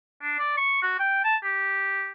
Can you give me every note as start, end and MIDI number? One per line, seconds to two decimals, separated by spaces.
0.22 0.37 62
0.38 0.54 74
0.57 0.82 85
0.82 0.95 66
0.99 1.19 79
1.24 1.36 81
1.43 2.10 67